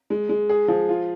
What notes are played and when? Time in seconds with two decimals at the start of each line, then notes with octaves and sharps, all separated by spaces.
0.10 G#3
0.29 G#3
0.49 G#4
0.68 F3
0.89 F4